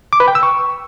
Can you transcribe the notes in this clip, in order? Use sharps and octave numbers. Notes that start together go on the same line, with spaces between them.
D6
B4
G5
E6
C#6